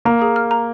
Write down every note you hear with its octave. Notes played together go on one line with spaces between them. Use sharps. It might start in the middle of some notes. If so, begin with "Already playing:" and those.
A#3 A#5
G#4
F6
A#5